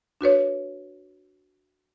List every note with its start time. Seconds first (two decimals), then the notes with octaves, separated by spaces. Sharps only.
0.21 D4 F#4 B4 C#5